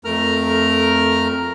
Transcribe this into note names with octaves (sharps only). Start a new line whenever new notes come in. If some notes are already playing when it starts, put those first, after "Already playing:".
F2 A3 A#4 A#5 F6